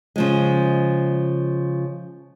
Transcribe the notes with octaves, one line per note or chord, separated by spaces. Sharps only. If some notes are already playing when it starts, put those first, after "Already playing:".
C#3 F3 G#3